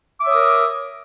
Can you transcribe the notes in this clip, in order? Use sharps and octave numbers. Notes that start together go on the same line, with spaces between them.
A#4 C#5 E5 D6 D#6